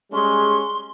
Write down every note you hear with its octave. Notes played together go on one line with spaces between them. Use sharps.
G3 G#3 C#4 C6